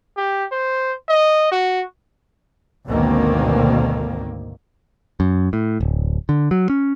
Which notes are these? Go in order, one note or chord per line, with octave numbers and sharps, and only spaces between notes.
G4
C5
D#5
F#4
G#1 D2 B2 D#3 A#3 C4
F#2
A2
D1
D3
F#3
C#4